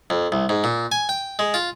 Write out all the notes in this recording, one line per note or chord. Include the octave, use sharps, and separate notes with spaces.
F2
C2
G#2
A#2
G#5
G5
G#3
F4